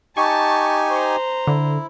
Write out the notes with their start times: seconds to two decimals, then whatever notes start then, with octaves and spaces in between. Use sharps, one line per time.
0.17 D#4 G4 G#5 A5 C#6
0.90 C5 A#5
1.47 D3 E4